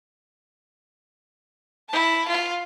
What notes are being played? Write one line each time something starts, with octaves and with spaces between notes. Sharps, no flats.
E4 A5
F4